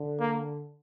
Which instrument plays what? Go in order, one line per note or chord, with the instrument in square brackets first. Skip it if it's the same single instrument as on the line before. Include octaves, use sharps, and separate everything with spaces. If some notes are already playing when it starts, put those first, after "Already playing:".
Already playing: [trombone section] D3
[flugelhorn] A#3